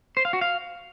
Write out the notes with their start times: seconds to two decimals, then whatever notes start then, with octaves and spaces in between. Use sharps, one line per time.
0.17 C5
0.25 F5
0.33 F#4
0.41 F5